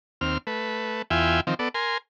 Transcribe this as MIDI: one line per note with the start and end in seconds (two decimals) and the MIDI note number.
0.21 0.38 39
0.21 0.38 60
0.21 0.38 89
0.47 1.02 57
0.47 1.02 71
1.11 1.41 40
1.11 1.41 65
1.11 1.41 76
1.11 1.41 79
1.11 1.41 80
1.47 1.54 51
1.47 1.54 53
1.47 1.54 60
1.59 1.69 59
1.59 1.69 69
1.59 1.69 74
1.74 1.98 70
1.74 1.98 80
1.74 1.98 84